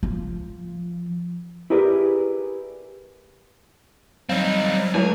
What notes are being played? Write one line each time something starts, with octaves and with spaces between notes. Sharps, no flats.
F3
E4 G4 G#4 A#4 B4 D5
F#3 G3 C4 D#4 F5
C#2 A2 C#3 F#3 E4 F4 G#5